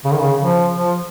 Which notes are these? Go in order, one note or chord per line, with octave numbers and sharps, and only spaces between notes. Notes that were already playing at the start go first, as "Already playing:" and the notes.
C#3
D#3
C#3
F3
F3